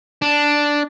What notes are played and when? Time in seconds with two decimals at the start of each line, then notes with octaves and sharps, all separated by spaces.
0.22 D4